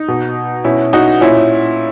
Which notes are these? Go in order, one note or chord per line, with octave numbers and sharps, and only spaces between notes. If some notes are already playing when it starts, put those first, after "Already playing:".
Already playing: D#4
B2
B2 C#4 E4
D#4 F#4
A#2 C#4 E4